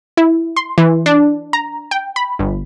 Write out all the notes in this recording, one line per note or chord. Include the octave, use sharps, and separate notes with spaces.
E4
C6
E3
D4
A#5
G5
B5
G1